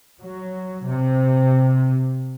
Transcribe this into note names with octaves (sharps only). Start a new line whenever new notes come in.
F#3
C3